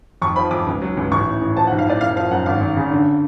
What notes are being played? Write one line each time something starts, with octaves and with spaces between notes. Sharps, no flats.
F2 C#6
F3 B5
F2 D6
C#2
F#3
C#2
A1 C#6
A2
A1
F3 A5
F#5
B1
F5
A2 D5
F#1 F5
F3 F5
F#2 F#5
G#1 F5
G#1
C#3
D3